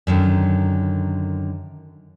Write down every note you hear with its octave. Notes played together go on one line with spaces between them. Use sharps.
F#2 D3 D#3